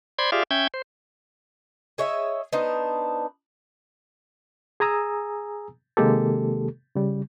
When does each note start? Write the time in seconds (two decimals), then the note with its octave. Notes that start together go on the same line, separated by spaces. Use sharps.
0.19 C5 D5 B5 C6 G#6
0.32 F4 G4 G#4 D5 E5 F5
0.51 C#4 E5 G5 G6 G#6
0.74 C5
1.98 G#4 C#5 D#5 E5
2.53 B3 D4 D#4 C5
4.80 G#4 G#5 A#5 D#6 E6
5.97 C3 D#3 G#3 A#3 G4 A4
6.95 C#3 G3